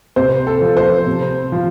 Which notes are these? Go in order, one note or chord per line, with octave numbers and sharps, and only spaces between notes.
C3 C5
A4
F3
C5
C3
F3